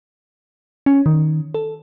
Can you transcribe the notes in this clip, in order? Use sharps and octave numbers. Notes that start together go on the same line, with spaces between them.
C#4
D#3
A4